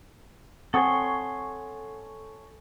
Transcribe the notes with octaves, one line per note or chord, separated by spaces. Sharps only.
C4 A4 C#5 F#5 G#5 C6 C#6 D#6